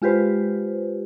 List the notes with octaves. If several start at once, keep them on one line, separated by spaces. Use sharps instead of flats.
G#3 F4 G4 B4 C5